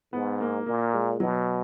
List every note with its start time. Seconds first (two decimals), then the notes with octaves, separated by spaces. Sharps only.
0.13 G#2 B3
0.41 A#3
0.66 A#2 A#3
0.94 G#3
1.20 B2 F#3